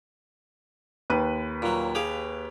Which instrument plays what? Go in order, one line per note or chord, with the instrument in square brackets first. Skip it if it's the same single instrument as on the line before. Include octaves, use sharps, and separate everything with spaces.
[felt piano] D#2 B4 D#7
[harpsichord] A#2 F#3
G4 G#4 F5